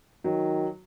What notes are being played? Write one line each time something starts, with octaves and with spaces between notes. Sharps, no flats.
D#3 F#3